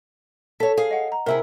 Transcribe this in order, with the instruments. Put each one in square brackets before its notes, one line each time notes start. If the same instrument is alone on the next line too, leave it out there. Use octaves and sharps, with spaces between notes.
[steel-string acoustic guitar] A4 C#5 [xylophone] B6
[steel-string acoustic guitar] G#4 F5
[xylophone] D#5 F#5
A#5
[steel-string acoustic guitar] C3 E4 G#4 [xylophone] A#4 E5 E6